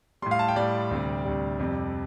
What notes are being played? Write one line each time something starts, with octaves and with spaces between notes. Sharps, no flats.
A2 G3 C6
F5
A5
G5
A2 G3 D5
D2 C3 G3
D2 C3 G3
F2 C3 G3